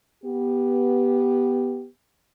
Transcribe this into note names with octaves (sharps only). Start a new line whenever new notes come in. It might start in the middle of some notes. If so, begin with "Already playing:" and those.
B3 G4